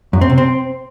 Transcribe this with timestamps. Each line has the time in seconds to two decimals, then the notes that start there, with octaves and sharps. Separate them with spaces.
0.13 F#2
0.21 C4
0.30 C3
0.38 C4